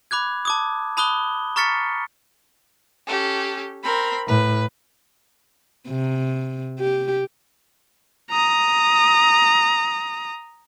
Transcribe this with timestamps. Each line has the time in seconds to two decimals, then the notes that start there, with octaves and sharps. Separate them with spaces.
0.11 B5 D6 F#6 G#6
0.45 A5 D6 D#6
0.97 A5 B5 D#6 F#6 G7
1.56 A#5 C#6 F6 A6 B6 C#7
3.07 C#4 G4 A4
3.83 C4 A#4 B5
4.27 A2 B4
5.88 C3
6.79 G4
8.31 A#5 D#6